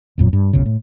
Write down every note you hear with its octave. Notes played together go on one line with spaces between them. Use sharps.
G#1 F2 A#2 F#3
G2
F1 B1 F#2 C#3
A2